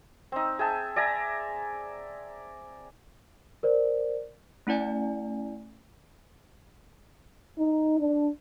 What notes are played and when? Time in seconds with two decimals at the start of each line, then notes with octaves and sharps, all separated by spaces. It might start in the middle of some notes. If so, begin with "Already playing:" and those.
0.32 C4 D#4
0.59 G#4 E5 G5 A5
0.96 D5 E5 G#5 A#5
3.63 A#4 C5 D5
4.67 A3 C#4 E4 D5 G#5
7.59 D#4
7.99 D4